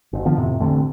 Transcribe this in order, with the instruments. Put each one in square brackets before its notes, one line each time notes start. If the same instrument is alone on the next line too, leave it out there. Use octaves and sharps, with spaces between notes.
[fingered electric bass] F#1
D3 E3 F3 B3
F2 A2 C3
A1 D3 A3 C4